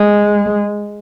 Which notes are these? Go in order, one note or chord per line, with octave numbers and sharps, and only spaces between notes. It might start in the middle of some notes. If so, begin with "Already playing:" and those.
Already playing: G#3